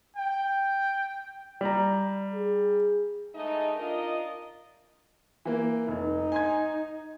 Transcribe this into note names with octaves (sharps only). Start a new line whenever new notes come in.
G5
G3 A#5
G#4
G#2 E3 A3 D#4 D#5
D4 D#4 F4 A#4 D#5
E3 A#3
F1 D#4
G#5 C6 G#6